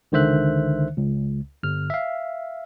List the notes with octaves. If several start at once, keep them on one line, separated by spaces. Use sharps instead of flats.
C#2 D3 D#3 C5 E5 F#6
C#2
G1 F6
E5 F5